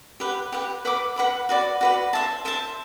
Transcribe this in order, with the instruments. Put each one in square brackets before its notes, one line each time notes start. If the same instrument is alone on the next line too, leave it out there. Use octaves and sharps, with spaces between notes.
[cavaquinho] G4 B4 F#5
G4 B4 F#5
B4 F#5 B5 D6
B4 F#5 B5 D6
F#4 B4 D5
F#4 B4 D5
C5 E5 A5
C5 E5 A5